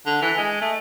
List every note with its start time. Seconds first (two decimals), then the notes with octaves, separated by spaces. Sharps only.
0.06 D3
0.22 E3
0.38 G#3
0.62 A3